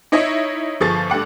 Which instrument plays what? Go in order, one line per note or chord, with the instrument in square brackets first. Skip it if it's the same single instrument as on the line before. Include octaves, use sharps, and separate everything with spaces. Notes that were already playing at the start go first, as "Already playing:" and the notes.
[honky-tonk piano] D#4 E4 C#5 D#5 E5
G1 F3 G#4 A4 C#6 A6
G2 A3 F#5 D6